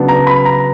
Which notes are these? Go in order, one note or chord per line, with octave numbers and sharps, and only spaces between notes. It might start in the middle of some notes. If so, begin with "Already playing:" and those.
Already playing: C#3 F#3 B3 D4
A#5
B5
A#5